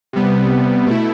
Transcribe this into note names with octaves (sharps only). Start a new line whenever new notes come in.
C3 G3 B3
B2 A3 E4